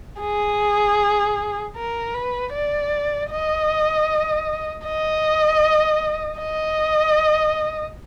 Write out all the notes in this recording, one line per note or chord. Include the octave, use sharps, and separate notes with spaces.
G#4
A#4
B4
D5
D#5
D#5
D#5